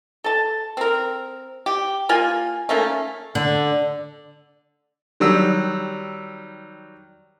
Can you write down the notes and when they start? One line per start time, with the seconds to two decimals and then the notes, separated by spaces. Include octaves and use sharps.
0.24 A4 A5
0.77 C4 A#4
1.66 G4
2.09 A#3 F4 G#5
2.69 A3 A#3 C#4 D#4
3.35 D3
5.20 D#3 F#3 G3 E6